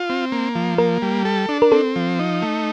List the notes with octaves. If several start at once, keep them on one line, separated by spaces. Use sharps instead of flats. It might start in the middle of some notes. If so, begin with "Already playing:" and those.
Already playing: F4
C4
A#3
F3
A#3 A#4
G3
A4
D4
A#4
C4 A4
F3
D#4
A3